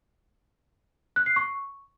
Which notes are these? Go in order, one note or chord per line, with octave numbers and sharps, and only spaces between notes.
F#6
C7
C#6